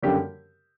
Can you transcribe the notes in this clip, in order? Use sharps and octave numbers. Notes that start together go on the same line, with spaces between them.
F#2 D3 G3 A#3 G4